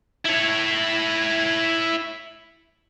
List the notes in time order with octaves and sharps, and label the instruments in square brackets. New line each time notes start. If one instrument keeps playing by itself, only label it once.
[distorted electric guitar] E4 C#5